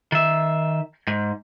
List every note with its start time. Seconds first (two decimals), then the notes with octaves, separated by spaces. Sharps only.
0.12 D#3 E5
1.07 G#2